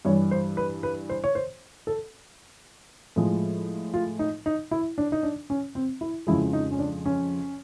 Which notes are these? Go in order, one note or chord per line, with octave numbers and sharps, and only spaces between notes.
G2 E3 G3 C#5
C5
B4
B4
C5
C#5
C5
A4
A2 F3 G#3
F4
D#4
D#4
E4
D4
D#4
D4
C#4
C4
E4
F2 C#3 F3 G#3 E4
D#4
C#4
D4
C#4